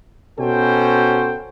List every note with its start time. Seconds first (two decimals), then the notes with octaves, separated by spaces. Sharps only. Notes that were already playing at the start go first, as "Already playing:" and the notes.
0.39 B2 C#4 F#4 A4 C5 G5